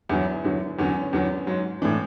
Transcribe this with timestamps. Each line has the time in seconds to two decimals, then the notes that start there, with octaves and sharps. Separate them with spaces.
0.09 E2 D3 F#3 E4
0.44 E2 D3 F#3
0.79 E2 D3 F#3 C#4
1.13 E2 D3 F#3
1.47 G#2 F#3
1.82 A2 E3 D4